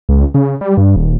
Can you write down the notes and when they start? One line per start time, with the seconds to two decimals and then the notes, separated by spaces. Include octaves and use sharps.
0.09 C#2
0.34 C#3
0.61 G3
0.77 G2
0.96 D#1